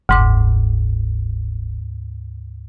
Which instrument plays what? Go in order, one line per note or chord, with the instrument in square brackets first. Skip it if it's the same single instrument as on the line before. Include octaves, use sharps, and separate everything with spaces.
[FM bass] F#1 [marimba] D2 G#2 D6